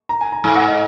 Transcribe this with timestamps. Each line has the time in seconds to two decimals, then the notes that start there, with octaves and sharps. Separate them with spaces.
0.09 A#5
0.21 G#5
0.32 A#5
0.44 G#2 G#5
0.55 F#5
0.68 D#5